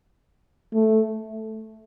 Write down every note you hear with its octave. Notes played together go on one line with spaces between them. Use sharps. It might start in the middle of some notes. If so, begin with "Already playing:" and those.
A3